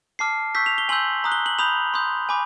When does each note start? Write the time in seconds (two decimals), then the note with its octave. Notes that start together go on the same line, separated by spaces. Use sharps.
0.19 A5 D6 F6 C7
0.55 C#6 E6 G6 B6
0.66 F7
0.78 G7
0.89 G#5 C6 E6 G6 F#7
1.24 A#5 D#6 F#6
1.32 G7
1.46 F#7
1.59 B5 D#6 G6 F7
1.94 C6 D#6 G6
2.29 G#5 B5 D6